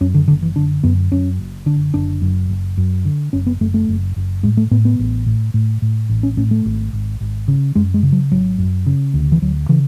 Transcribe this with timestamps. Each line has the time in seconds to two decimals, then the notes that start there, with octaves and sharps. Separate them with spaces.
0.01 F#2 C#4
0.14 D3
0.28 F#1 D3
0.42 E3
0.56 D3 D4
0.83 F#2 B3
1.12 F#2 C#4
1.39 F#1
1.66 D3 D4
1.94 F#1 D4
2.22 F#2
2.49 F#1
2.78 F#2
3.05 D3
3.33 F#1 C#4
3.46 B3
3.61 F#1 A3
3.74 A3
3.89 F#1
4.16 F#1
4.43 A2 G#3
4.57 A3
4.71 A2 B3
4.85 B3
4.99 A1
5.26 A2
5.54 A2
5.82 A2
6.09 A1
6.23 C#4
6.37 A2 C#4
6.51 A3
6.65 G#1
6.93 G#1
7.21 G#1
7.48 C#3
7.75 F#2 G#3
7.94 G#3
8.03 C#3
8.12 F#3
8.31 G#1 F#3
8.58 F#2
8.86 C#3
9.14 D2
9.32 E3
9.42 D2 F#3
9.69 C#3 E3